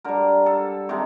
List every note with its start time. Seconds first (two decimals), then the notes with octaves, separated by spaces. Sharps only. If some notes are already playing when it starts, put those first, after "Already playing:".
0.04 D3 G3 A#4
0.46 A4
0.89 C3 D#3 G#3